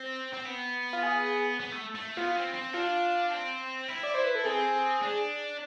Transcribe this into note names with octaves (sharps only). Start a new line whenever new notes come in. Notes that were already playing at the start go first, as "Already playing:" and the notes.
Already playing: C4
C4
B3
F4
G#4
B3
A3
A3
B3 F4
C4
C4
D4 F4
C4
E4
D5
C5
B4
A4
C4 G#4
D4